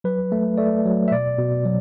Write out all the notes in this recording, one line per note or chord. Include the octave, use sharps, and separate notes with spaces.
F#3 B4
A3
A3 D5
F#3
E5
B2 D5
B2
F#3